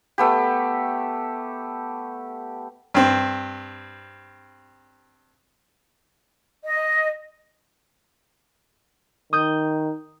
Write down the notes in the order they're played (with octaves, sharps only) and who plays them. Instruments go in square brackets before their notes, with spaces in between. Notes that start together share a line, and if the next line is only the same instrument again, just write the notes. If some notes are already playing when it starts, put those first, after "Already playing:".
[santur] A3 B3 G4
[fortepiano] G2 C4
[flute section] D#5
[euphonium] D#3 [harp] D#6 G6